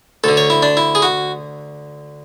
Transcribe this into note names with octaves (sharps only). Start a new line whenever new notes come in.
D2 D3 A4
C#5
E4
D4
E4
G#4
F#4